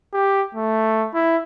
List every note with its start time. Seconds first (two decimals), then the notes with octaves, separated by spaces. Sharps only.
0.13 G4
0.55 A3
1.14 E4